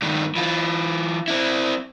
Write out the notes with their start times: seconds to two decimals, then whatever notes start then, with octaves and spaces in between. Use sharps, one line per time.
0.02 G2 D#3
0.36 E3 F4
1.28 C4 E4